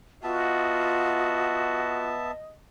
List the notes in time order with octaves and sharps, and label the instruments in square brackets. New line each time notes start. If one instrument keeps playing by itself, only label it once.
[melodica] B3 E5 A5 [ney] F4 [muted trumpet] F#4 [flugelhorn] D#5